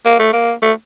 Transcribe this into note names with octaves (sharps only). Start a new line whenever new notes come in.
A#3
A3
A#3
A3